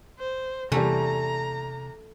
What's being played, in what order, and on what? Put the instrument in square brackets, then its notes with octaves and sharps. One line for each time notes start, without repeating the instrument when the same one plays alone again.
[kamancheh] C5
[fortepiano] E2 G3 [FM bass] C3 [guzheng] A3 [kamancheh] A#5